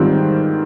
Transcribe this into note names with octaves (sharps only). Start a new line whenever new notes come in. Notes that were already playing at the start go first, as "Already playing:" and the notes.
Already playing: G#2 D#3 G3 C4 F4